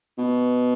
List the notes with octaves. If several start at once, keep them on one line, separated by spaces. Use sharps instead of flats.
B2